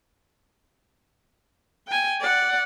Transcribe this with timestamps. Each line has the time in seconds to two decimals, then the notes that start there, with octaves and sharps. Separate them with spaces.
1.87 G5 G#5
2.20 D5 F#5